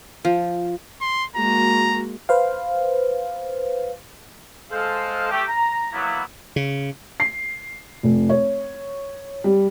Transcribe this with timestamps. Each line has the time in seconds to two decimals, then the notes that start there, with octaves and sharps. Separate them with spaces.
0.25 F3
1.01 C6
1.37 G#3 A#3 F#4 A#5
2.29 B4 C5 F5
4.71 G#3 A4 C5 F5
5.31 A3 G4
5.48 A#5
5.93 F#3 A#3 B3 E4
6.56 C#3
7.20 C7
8.03 F1
8.29 C#5
9.44 G3